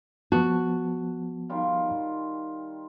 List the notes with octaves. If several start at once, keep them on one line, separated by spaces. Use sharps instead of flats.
F3 B3 F#4 A5
D#3 G3 F4